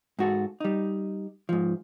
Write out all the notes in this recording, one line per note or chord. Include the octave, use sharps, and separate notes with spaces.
G#2 F#4 A4
G3 D#4
G#2 F3